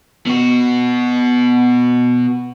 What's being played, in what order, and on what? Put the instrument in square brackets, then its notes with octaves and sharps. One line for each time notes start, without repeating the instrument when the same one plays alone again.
[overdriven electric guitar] B2 F#4